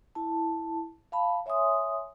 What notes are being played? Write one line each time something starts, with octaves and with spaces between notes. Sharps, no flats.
E4 A5
F5 A5 B5
C#5 E5 G#5 C6 D#6